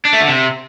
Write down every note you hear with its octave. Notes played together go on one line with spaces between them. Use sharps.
D4
A3
D3
C3